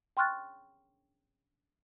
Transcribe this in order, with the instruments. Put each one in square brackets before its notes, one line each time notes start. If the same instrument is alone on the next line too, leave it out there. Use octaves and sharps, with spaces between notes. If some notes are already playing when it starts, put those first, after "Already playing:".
[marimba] G5 C6 C#6 F6 F#6 A6